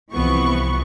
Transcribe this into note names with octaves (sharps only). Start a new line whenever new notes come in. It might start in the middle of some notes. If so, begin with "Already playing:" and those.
C2 E3 F3 B3 C#6